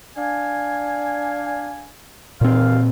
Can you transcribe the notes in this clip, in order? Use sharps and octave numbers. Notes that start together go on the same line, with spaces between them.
D4 F5 G#5
D#2 A#2 E3 C4 F5